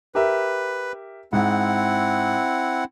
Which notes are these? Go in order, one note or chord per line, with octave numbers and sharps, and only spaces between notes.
G4 A#4 B4 E5
G#2 C4 E4 F#5